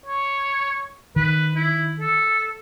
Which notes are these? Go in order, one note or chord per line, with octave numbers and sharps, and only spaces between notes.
C#5
D#3 B4
E4
A4